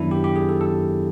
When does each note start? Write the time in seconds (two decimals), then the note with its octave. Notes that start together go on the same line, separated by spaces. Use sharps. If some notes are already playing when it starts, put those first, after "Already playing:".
Already playing: F#2 D#3 F#3 B3 D4 E4
0.11 G4
0.24 G4
0.36 G#4
0.49 A4
0.61 A4